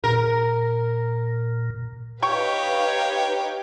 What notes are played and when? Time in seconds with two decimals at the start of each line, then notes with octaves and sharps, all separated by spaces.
0.04 A#2 A#4
2.22 D#4 G4 B4 C#5 F5 G5 C#6